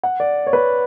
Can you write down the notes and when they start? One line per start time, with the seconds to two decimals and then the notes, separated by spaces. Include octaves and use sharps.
0.03 F#5
0.20 D5
0.47 C#5
0.53 B4